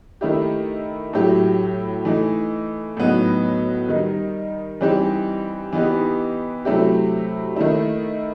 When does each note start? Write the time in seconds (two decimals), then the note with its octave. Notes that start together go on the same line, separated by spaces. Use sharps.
0.21 D#3 A3 E4 G4
1.13 A2 F#3 A3 E4 G4
2.05 E3 A3 D#4
2.97 A2 F#3 B3 D#4 F#4
3.89 D#3 G3 D#4
4.81 E3 G3 C4 D#4 G4
5.73 E3 B3 D#4 G4
6.65 C3 F#3 A3 E4 G4
7.56 D#3 A3 E4